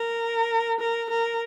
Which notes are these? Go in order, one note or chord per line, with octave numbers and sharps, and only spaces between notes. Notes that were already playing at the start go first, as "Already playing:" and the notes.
Already playing: A#4
A#4
A#4